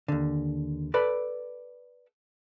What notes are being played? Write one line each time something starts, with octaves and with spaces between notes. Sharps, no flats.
D#2 D3
A4 B4 D5 B5